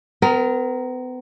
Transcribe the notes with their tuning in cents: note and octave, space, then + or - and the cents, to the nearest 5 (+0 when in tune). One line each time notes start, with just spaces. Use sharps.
B3 +40 A#4 +0